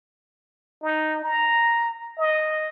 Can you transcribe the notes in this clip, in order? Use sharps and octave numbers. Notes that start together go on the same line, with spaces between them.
D#4
A#5
D#5